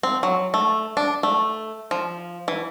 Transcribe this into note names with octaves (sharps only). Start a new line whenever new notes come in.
C4
F#3
A3
D4
A3
F3
E3